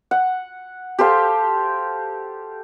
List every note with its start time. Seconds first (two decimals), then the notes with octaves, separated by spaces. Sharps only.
0.11 F#5
0.99 G4 A4 C5 F5